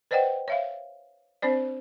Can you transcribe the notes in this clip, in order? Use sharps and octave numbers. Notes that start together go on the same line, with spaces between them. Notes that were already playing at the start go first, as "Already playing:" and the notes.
B4 C5 D5 D#5 F#5 G5
C#5 E5 F5
C4 D4 C5 D5